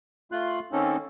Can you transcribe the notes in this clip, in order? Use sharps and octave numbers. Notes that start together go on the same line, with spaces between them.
A3 F4 C6 F#6
D#3 A#3 C4 C#4 D#4 A4